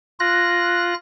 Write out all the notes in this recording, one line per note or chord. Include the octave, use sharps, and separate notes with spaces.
F4 F#6 A#6